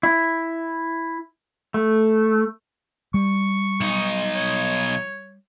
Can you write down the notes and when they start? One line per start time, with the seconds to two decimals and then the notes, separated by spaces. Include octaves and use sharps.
0.03 E4
1.74 A3
3.14 G3 C#6
3.81 B1 D#4
4.35 C#5